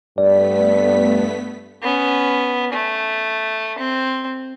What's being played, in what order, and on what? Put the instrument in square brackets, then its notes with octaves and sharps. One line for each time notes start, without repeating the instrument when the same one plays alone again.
[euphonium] G2 [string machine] A3 B3 B6 [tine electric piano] D5
[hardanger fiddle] B3 C#4
A3
C4